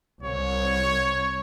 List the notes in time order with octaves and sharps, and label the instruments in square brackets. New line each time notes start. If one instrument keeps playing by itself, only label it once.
[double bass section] C2 [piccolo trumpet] C#5